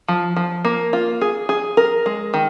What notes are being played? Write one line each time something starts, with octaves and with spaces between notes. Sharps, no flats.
F3
F3
A#3
F4
G#4
G#4
A#4
G#3
D#3